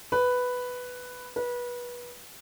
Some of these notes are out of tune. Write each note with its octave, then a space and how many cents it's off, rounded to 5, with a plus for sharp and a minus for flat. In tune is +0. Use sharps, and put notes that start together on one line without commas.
B4 +5
B4 -25